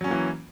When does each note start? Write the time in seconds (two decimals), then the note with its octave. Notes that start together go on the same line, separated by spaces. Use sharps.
0.01 F#3
0.04 C#4
0.08 A#3
0.11 E3